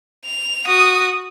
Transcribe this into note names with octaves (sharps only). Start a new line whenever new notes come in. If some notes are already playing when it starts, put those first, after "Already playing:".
F7
F#4 D#6